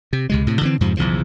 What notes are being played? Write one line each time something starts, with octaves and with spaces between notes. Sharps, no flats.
C3
C#2 C3 G#3
A2 C3
D3 E3 C4
F2 G#2 C3 F3
B1 E2 C#3 F3